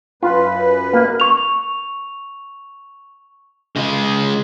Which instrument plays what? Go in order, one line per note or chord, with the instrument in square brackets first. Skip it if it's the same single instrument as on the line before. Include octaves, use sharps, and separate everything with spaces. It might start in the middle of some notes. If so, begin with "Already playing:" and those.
[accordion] F#2 B4 [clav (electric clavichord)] F4
[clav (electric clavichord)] A#3
[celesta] C#6 F7
[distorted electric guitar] C#3 G#3